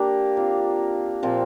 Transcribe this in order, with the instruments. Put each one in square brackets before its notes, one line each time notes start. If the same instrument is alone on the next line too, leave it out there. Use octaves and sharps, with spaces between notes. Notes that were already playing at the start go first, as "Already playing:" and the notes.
Already playing: [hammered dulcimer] A#3 D4 G4
C4 F4 A#4
A#2 F3 C4 F4